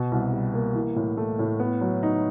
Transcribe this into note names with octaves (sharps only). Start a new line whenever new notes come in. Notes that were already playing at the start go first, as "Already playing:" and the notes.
Already playing: B2
C2
G3
A#3
E3
A2
A3
A2
B3
F#3
D#4